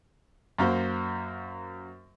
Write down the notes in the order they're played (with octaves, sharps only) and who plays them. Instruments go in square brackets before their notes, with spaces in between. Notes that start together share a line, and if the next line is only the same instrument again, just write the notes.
[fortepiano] F#2 A#3 F#4 C5